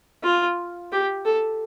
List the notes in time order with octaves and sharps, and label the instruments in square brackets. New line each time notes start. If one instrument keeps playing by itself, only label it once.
[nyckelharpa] F4
G4
A4